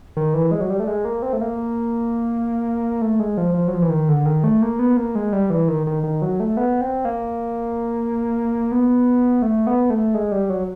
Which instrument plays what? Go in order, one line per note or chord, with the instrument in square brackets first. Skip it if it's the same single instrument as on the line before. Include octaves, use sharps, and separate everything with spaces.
[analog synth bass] D#3
E3
G#3
F#3
G3
A3
G#3
A#3
C4
A3
A#3
A3
G#3
F3
F3
F#3
F3
E3
D#3
D3
D#3
A3
A#3
B3
A#3
G#3
G3
E3
D#3
D#3
D#3
F#3
A3
B3
C4
A#3
B3
A3
B3
A3
G#3
G3
F#3